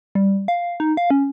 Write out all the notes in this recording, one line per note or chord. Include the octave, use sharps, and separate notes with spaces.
G3
F5
D#4
F5
C#4